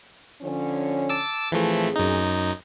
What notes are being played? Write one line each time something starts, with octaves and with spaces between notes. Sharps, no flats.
D3 F3 C#4
A5 D6 E6
A2 E3 F3 A3 C4 G#4
F#2 D#4